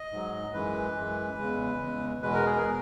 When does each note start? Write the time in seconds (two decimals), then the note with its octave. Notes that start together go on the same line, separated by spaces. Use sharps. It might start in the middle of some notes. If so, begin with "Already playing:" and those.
Already playing: D#5
0.11 G#2 F#3
0.53 F#2 E3 G#3 B4
0.95 F#2 E3 G#3
1.38 E2 C#3 G#3
1.80 E2 C#3 G#3
2.22 E2 B2 G#3 B4
2.33 A#4
2.46 G#4
2.57 A#4
2.65 B2 G#3